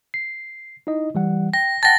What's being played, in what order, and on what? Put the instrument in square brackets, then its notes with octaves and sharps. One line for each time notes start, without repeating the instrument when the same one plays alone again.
[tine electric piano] C7
D#4 E4 D#5
E3 G3 F#5
[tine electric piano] G5 [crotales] A#6
[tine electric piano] F#5 G5 A5 [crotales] A6 A#6